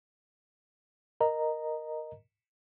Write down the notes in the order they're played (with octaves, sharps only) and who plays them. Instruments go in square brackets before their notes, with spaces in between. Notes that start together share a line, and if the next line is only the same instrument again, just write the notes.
[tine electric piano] A#4 D#5 A#5